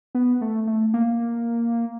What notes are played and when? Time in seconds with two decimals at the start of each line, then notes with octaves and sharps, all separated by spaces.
0.15 B3
0.41 A3
0.67 A3
0.94 A#3